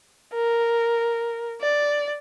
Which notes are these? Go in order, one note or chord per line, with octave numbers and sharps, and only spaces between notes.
A#4
D5